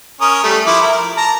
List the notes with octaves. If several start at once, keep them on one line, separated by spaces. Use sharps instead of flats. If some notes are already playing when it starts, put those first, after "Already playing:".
C#4 A#4 D#6
G3 A3
F3 E4 D6
A#4
A5 A#5